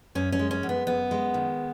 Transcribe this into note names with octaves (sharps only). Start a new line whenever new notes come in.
F#2 C#4
C#4
G#3
C#4
F#2
B3
F#2 B3
G#3
D#3